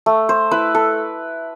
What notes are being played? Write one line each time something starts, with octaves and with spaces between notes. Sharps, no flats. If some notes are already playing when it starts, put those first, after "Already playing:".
A3
C5
E4 B4
A4